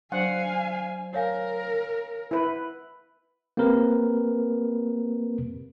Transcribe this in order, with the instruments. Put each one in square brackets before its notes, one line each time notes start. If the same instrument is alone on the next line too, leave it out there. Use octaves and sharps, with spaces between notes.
[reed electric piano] F#3 D4 C5 [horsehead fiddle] F5 G#5 [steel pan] F#5
[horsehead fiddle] A#4 [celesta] C#5 F5 G#5
[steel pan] E4 B4
[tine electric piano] A#3 C4 G4 A#4 B4